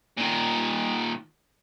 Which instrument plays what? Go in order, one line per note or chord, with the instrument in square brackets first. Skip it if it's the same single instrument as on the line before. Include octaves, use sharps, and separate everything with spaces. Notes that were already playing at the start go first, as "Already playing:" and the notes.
[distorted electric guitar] A#2 D#3